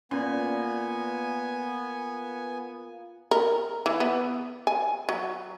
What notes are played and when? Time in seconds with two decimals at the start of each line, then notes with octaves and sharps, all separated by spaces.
0.11 A#2 B3 C#4 G#5
3.31 A#4
3.86 E3
4.00 B3
4.67 G#5
5.09 F#3